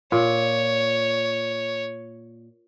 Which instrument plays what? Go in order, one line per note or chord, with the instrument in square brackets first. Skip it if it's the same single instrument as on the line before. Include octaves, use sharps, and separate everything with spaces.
[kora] A#2 [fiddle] C#5